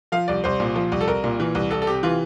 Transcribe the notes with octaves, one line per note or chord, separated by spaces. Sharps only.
F3 F5
C2 D5
C2 C5
A#2
F3
C2
A4
C2 A#4
A#2
E3
C2
C2 A4
A4
C3 G4
E3 F4